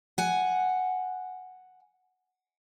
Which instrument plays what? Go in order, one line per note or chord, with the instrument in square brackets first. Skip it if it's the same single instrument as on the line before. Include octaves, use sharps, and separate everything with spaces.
[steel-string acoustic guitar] F#5 G#5